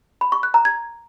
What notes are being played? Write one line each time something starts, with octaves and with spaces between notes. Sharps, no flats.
B5
C#6
F#6
A#5
G#6